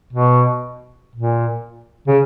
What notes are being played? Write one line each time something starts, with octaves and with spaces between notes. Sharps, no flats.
B2
A#2
C#3